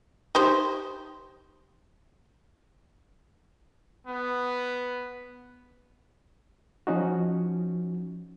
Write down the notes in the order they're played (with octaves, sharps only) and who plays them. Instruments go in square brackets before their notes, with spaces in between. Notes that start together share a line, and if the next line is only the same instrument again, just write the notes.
[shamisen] D#4 G4 C5
[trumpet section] B3
[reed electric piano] F3 C#4 D#4 F#4